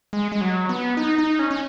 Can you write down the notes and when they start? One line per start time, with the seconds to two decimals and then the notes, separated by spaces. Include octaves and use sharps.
0.13 G#3
0.32 G#3
0.41 F#3
0.69 B3
0.97 D#4
1.18 D#4
1.39 C#4
1.51 C#4